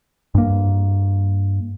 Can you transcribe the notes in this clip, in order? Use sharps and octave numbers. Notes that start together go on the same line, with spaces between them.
G2 A#3